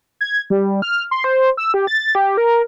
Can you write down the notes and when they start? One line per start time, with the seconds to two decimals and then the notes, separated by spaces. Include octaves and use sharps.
0.21 G#6
0.50 G3
0.82 F6
1.11 C6
1.24 C5
1.57 E6
1.74 G4
1.87 A6
2.15 G4
2.37 A#4